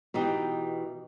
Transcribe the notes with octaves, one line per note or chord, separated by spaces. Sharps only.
B2 E3 D#4 G4